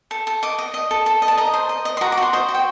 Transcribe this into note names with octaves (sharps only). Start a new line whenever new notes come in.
A4
A4
D#5 D6
D#5
D#5
A4
A4
D#5
A5
D#5 A#5
C5
D#5
D#5
C6
F#4 A#5
D6
F#4
C6
C5 D#5
F#4
G5